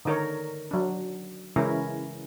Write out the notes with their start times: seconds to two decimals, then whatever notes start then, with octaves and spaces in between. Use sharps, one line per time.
0.05 D3 D#3 D#4 A#4 C#5
0.71 F#3 D4
1.56 C#3 E3 G#3 C#4 E4 A#4